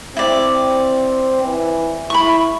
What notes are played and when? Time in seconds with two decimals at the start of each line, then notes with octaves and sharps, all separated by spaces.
0.17 C4 E4 D5
1.43 E3
2.10 E4 B5 C#6